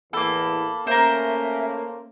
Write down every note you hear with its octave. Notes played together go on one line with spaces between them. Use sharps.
E2 A2 E3 A#3 A4 B5
A3 A#3 C#4 A#4 C5 E5